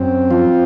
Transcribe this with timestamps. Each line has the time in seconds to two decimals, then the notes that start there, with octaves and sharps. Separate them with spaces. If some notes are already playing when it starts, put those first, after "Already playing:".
Already playing: F#2 C4
0.31 F3 F4